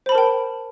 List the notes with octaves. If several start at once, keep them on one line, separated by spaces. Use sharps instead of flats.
A#4 C5 G5 A5 B5